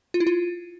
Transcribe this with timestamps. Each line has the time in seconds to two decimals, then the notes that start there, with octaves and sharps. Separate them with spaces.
0.14 F4
0.20 E4
0.27 F4